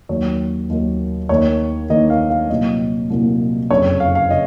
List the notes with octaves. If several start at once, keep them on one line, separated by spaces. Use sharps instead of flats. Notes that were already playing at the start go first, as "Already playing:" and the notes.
D#2 D#3 F#3 A#3 C#5
D#2 D#3 F#3 A#3
D#2 D#3 A#3 C#5
D#2 D#3 A#3 D#5
F5
F5
C2 A#2 F#3 A#3 D#5
C2 A#2 F#3 A#3
F#1 F2 C#3 C#5
F5
F5
C#3 D#5